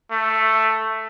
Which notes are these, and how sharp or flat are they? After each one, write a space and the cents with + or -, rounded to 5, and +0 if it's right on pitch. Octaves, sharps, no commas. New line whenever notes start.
A3 +5